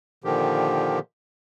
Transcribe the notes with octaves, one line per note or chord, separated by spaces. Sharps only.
A#2 D3 D#3 F3 G4